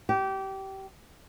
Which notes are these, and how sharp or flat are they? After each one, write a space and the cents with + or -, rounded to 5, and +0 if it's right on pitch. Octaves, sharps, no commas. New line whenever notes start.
G4 -25